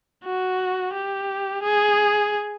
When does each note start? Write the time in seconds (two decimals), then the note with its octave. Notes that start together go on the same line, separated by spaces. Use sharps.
0.25 F#4
0.94 G4
1.62 G#4